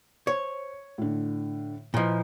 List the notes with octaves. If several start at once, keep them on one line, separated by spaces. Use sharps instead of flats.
C5 C#5
A2 D3
A#2 F3 E4 B4 D#5